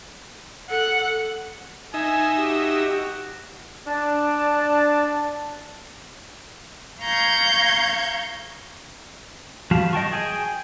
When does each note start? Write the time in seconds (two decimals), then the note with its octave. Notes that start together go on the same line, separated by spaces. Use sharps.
0.70 A4 F#5
1.94 D#4 E5 G#5
2.37 F#4 G4
3.87 D4 A5
7.01 F5 A#5 C#6 G6 G#6
9.71 F3 G3 F#4 F5 A5
9.93 D#5 G5 A5 C#6
10.12 G#4 G5 G#5